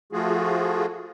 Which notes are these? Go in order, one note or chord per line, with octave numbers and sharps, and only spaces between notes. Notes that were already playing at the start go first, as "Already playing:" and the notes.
F3 A3 F4 F#4 G#4